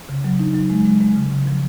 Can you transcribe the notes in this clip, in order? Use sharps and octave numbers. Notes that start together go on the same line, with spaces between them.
C#3
F#3
D#4
F#3
G#3
G#3
G#3
C#3
C#3
F3